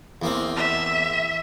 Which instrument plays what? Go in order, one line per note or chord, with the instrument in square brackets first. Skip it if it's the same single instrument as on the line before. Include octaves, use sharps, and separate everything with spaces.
[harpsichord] E2 A#3 C4
[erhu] E5